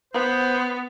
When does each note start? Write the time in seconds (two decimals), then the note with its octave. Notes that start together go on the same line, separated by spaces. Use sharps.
0.14 B3 C5